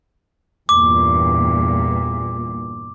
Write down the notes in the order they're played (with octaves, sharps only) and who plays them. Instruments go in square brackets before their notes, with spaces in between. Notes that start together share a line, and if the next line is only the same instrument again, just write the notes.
[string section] E2 G2 A#2 [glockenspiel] D6